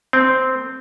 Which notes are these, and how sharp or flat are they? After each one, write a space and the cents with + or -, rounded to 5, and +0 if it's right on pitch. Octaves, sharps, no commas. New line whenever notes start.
C4 -10